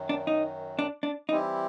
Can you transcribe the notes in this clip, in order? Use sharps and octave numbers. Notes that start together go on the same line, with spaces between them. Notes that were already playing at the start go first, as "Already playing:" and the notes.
Already playing: F#2 D#3 F#3
D4
D#4
D4
D4
E3 G3 C4 D#4 E4 G4